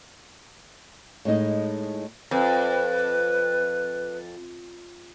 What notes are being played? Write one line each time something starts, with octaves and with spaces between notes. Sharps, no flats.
A2 G#3 D#4 D#5
F2 B4